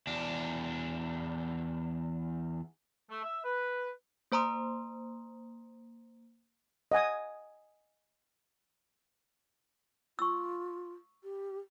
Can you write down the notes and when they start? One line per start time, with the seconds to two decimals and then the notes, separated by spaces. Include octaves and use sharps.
0.07 E2 D4
3.10 A3
3.24 E5
3.45 B4
4.32 A#3 C5 A#5 C6 D#6
6.92 D#5 F#5 G#5 D#6
10.19 F4 C#6 E6
11.24 G4